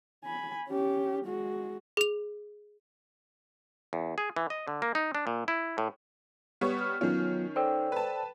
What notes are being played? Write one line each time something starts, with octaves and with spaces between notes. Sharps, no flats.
G#5 B5
C#4 G4
G#3 F#4
G#4 F7
E2
G#4
E3
D#5
D3
A#3
D#4
D4
A#2
E4
A2
G3 B3 C#5
F6
D#3 F#3 B3 C#4 F4
A4 C5 D5 G5 E6
B4 A5